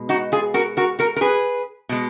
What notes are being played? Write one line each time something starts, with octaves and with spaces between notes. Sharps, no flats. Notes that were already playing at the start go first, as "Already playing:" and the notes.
Already playing: B2 G#3
D#4 F#4
F4 G#4
F#4 A#4
F#4 A#4
F#4 A#4
A#4
G#4 B4
B2 G#3